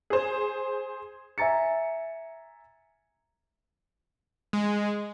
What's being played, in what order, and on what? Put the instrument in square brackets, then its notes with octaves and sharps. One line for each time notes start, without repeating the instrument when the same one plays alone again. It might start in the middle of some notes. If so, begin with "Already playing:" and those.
[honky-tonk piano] G#4 C5
[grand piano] E5 G#5 A#5 A6 C#7
[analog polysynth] G#3